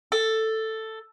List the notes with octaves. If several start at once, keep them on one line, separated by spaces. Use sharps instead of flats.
A4